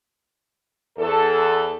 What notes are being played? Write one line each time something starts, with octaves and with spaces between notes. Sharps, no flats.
E2 A4